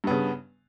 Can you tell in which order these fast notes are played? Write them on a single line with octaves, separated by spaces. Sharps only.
G2 B3 C#3